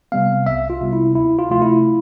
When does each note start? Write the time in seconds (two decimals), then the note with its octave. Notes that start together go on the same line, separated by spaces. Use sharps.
0.12 C3 G3 B3 F5
0.46 C2 E5
0.70 F4
0.81 C3 G3 B3
0.93 E4
1.15 D2 E4
1.39 F4
1.50 C3 F3 A3 F4
1.62 E4